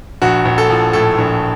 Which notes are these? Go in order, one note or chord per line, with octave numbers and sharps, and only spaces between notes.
A#1 F#4
A#1
A4
F3
A2 A4
A#1